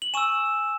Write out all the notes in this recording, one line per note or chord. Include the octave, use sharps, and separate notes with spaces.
F#7
G#5 C#6 E6 E7